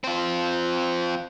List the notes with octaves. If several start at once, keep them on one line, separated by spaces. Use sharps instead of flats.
C4 F4